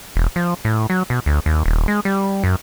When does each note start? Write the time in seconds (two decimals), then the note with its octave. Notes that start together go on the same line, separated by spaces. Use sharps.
0.16 E1
0.36 F3
0.65 A2
0.90 F#3
1.10 B2
1.26 D2
1.46 D#2
1.66 D#1
1.88 G#3
2.05 G3
2.44 F#2